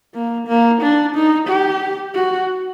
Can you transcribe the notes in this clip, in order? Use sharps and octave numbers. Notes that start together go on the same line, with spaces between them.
A#3
A#3
D4
D#4
G4
F#4